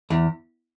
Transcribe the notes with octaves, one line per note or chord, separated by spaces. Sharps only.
E2